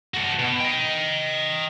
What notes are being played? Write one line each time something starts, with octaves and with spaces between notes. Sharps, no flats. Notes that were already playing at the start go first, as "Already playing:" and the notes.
F#4 A4
B2
D#5 G5